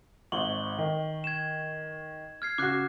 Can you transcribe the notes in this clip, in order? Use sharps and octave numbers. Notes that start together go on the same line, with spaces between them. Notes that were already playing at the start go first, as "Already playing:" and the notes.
G#1 G#2 C#6 F#7 G7
D#3
G#6 E7
F6 G#6 C7
C#3 F#4 D6 F#6 C7